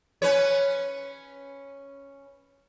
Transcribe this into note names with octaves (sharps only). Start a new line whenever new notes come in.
C#4 B4 C#5